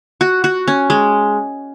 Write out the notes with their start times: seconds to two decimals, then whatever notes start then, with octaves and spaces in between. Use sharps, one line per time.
0.21 F#4
0.44 F#4
0.68 C#4
0.90 G#3